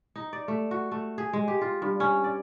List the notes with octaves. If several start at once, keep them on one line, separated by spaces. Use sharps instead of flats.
D#4
D5
A3
F#4
A3
G#4
G#3
G4
F4
G2
C#4
D5